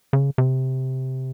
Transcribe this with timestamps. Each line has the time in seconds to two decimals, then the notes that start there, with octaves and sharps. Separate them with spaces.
0.13 C#3
0.38 C3